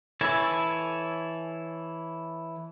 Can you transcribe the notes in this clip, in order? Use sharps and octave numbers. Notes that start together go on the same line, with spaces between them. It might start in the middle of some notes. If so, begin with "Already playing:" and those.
E3 E4 A4 C#5 G#5